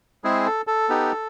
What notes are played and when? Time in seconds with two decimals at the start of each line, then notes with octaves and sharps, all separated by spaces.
0.24 G#3 C4 E4 G#4
0.46 A4
0.67 A4
0.89 B3 D#4 G4